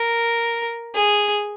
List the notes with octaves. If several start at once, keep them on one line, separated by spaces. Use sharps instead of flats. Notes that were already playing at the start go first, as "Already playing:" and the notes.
Already playing: A#4
G#4